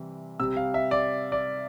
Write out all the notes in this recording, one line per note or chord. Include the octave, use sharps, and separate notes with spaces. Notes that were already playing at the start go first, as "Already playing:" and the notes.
Already playing: C3 E3 G3
C3 G3 E6
F5
E5
D5
D5